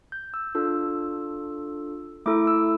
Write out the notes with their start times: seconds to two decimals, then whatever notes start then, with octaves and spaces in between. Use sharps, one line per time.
0.12 G6
0.34 E6
0.55 D4 F4 A4 E6
2.26 A3 E4 A4 D6
2.47 E6